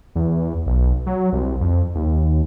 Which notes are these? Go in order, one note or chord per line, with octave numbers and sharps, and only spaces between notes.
E2
B1
F#3
C2
F2
D#2